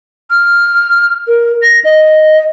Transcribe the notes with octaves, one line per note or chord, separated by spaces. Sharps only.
F6
A#4
A#6
D#5